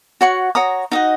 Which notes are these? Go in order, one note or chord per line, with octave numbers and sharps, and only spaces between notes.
F#4 C#5 F#5 C#6
F#4 C#5 A#5 D#6
D#4 F#4 D#5 F#5